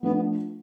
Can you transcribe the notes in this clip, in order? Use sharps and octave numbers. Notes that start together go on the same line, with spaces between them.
F3 A3 B3 D4 F4
B3